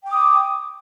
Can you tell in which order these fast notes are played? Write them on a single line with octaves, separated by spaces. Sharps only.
G5 D6 D#6